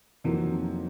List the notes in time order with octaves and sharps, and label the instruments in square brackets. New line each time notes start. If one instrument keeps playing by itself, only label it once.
[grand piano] F2 C3 D#3 F#3 A#3 [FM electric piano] E3